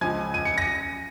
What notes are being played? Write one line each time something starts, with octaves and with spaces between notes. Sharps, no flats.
C#2 C#3 F3 G#5 G#6
D#7
C#7
A#6